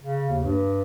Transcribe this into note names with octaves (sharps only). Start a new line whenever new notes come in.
C#3
D#2
G2